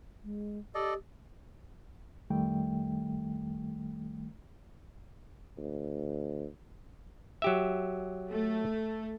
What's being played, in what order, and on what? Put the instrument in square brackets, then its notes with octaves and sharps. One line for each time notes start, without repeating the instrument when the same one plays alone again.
[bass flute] G#3
[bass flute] G4 [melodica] A4 D5 D#5
[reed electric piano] F2 D#3 G3 A3 G5
[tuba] D2
[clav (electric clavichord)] F#3 G4 E5
[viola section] A3